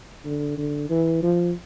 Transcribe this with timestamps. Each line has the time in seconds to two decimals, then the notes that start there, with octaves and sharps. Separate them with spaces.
0.25 D3
0.58 D3
0.90 E3
1.23 F3